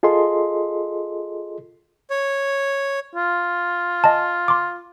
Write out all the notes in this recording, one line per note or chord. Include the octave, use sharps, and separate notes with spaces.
F4 G#4 A4 D#5 C6
C#5
F4
D#5 G#5 A5
C6 D6